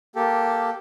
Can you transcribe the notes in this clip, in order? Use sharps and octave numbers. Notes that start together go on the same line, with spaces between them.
A#3 G4 A4